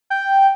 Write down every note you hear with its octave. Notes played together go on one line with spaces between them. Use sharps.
G5